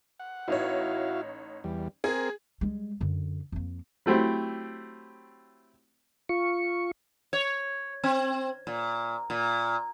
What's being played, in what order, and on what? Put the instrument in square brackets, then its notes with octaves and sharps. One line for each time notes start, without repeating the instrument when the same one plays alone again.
[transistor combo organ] F#5
[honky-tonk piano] A1 D#4 C#5 [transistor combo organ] E4 F#4 F5
[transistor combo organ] E2 G3
[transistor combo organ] C4 A#4 [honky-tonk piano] G#4
[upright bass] G3 G#3
F#2 D3
F2 A#3
[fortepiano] F#3 A3 C4 E4 G4
[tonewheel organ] F4 C#6
[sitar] C#5
C4
A#2
A#2